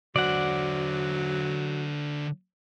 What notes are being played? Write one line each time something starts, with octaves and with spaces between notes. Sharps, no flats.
D3 F#3 C5 D5 F#5